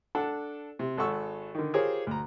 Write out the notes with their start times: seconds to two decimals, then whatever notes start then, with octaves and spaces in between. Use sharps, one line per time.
0.15 D4 A4 F#5
0.79 C3
0.98 G#1 A4 F#5 C#6 E6
1.54 D3 D#3
1.74 F4 G4 G#4 A#4 C5 C#5
2.07 D2 A#5